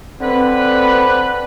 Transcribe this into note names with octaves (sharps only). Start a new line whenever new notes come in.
D3 C4 B4